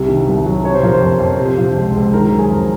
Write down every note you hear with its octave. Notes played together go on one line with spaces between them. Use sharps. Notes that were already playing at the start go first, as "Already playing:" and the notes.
Already playing: C2 C3
D#3
C2
F#3
C3 C#5
C5
F3 A#4
C5
F2
F2
C3
F3
C#2
C#2
D#3 A#4
F#3
G#4
F2